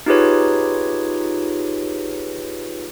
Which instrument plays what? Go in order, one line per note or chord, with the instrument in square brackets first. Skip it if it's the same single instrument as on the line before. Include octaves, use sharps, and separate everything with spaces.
[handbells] D#4 F4 G4 G#4 B4 C#5